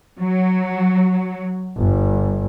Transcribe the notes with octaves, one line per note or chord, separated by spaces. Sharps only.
F#3
G1